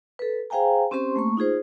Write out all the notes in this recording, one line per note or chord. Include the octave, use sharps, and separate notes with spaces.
A4 B4
G#4 C5 F5 G5 G#5 A#5
C4 C#4 G4 C5 C6 C#6
A3 A#3 C#6
D#4 F4 G#4 C5